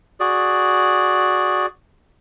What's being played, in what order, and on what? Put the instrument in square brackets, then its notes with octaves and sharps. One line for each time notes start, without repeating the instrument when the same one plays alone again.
[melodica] F#4 G#4 D5